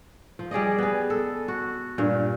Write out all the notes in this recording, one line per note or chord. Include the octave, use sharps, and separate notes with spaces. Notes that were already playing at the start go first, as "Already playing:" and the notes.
F3
G3 G#4 D5 D#5
B3 G#4
A4
F#4
G2 A#2